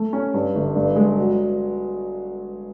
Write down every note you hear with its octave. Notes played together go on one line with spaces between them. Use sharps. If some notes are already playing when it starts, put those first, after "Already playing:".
Already playing: A3
C#4
G2
G1
G2
G#3
F#3